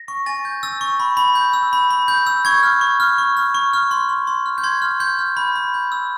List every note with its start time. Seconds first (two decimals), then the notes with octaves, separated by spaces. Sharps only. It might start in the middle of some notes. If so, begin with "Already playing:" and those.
Already playing: A#6
0.08 C#6
0.26 G#5 A6
0.45 G6
0.63 E6 A6
0.81 C#6
1.00 B5
1.17 B5
1.35 G6
1.53 E6
1.73 B5
1.91 B5
2.08 G6
2.27 E6
2.45 C#6 G#6
2.63 F6
2.81 C#6
3.00 F6
3.18 C#6
3.37 F6
3.55 C#6
3.73 F6
3.91 C6
4.09 F6
4.27 C6
4.46 F6
4.58 G6
4.64 C6 G#6
4.82 F6
5.00 C6 G6
5.19 F6
5.37 B5
5.56 B5
5.74 G6
5.92 E6